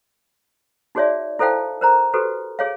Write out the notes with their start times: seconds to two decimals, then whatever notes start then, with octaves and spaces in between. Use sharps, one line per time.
0.95 D#4 F#4 G#4 C#5 D5 E5
1.39 E4 A4 C5 F5 G5 A5
1.81 A#4 C5 A#5
2.13 F#4 G4 A4 B4 C5
2.59 G#4 C#5 F5